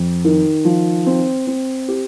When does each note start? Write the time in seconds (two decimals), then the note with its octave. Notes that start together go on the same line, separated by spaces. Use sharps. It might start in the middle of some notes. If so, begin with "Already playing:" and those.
Already playing: F2
0.25 D#3
0.65 F3
1.06 C4
1.47 C4
1.88 G4